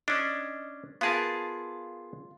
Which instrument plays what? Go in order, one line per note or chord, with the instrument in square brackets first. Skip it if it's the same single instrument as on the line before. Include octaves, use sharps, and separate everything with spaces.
[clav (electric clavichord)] C#4 D4 [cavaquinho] D#5
[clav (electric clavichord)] B3 G#4 A#4 [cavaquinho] F4 A5